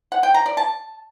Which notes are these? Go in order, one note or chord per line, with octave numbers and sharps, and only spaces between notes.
F#5
G5
A#5
D5
A5